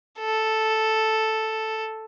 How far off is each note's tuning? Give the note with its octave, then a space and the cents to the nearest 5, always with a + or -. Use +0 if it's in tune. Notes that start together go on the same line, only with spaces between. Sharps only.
A4 +0